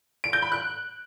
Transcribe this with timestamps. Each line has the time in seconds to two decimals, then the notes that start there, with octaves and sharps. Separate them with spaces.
0.24 D7
0.33 G6
0.42 B5
0.52 F#6